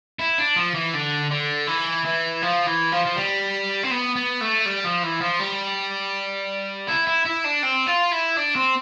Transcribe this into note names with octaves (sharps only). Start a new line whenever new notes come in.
E4
D4
F3
E3
D3
D3
E3
E3
F3
E3
F3
F3
G3
C4
B3
B3
A3
G3
F3
E3
F3
G3
E4
E4
E4
D4
C4
F4
E4
D4
C4